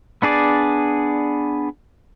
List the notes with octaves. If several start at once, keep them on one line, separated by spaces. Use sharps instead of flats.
B3 D4 G#4 D5